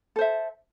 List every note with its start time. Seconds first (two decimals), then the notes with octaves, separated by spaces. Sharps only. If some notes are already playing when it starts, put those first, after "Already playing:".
0.16 A4
0.18 C5
0.21 E5